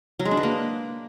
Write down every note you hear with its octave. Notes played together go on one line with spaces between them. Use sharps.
F#3
G#3
D4
B4
A#3